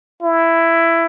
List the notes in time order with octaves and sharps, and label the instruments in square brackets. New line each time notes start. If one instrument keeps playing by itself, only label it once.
[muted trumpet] E4